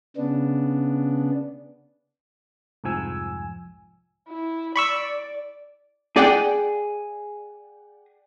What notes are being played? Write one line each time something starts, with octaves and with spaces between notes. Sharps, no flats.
C#3 B3 D4
C2 F2 G#2 F3 G#5 E6
E4
D5 B5 C#6 E6
G#4 D5 F#5 G5